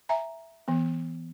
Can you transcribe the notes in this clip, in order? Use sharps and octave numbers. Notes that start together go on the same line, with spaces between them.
E5 G#5 A#5
E3 B3